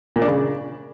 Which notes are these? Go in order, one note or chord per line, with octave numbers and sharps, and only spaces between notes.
A#2
D4
C#3